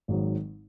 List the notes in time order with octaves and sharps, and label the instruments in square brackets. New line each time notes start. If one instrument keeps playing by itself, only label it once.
[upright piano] G#1 G#2 D#3 F#3